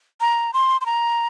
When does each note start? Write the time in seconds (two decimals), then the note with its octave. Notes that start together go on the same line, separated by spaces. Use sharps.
0.21 A#5
0.54 C6
0.81 C6
0.86 A#5